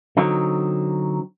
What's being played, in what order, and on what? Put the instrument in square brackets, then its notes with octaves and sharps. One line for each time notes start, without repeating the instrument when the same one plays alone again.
[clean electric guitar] D3 F#3 C4 D#4